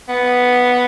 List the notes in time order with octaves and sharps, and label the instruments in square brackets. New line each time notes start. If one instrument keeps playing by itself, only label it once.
[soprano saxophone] B3